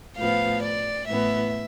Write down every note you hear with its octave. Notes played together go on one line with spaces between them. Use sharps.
A2 F3 B3 F5
D5
A2 E3 B3 E5